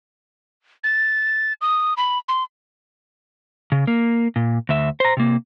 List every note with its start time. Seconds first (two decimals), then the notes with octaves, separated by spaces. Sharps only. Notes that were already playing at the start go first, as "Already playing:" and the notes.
0.84 A6
1.61 D#6
1.97 B5
2.28 C6
3.72 C#3
3.87 A#3
4.36 A#2
4.69 D2 E5
5.00 C5 A#5
5.17 C3 A#3